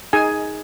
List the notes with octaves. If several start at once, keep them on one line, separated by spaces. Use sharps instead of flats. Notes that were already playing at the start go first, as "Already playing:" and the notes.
D#4 G#4 G#5